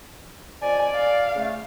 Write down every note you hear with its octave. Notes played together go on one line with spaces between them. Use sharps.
F2 D5 G#5
F5
C#3 A3